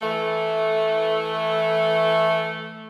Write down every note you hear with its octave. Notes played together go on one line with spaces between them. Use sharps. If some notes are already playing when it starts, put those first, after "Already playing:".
E3 A3